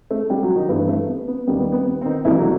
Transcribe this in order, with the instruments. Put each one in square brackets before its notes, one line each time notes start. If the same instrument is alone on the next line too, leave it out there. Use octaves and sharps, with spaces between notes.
[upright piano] A3 A4
G3 G4
F#3 F#4
D#3 D#4
G2 E3 A3 B3
A3
B3
B3
D#2 D#3 G3 B3
B3
B3
B3
C4
D#3 D#4
C2 B2 E3 A3 E4
F#3 F#4